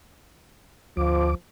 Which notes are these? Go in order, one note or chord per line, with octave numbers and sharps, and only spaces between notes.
D2 F3 D6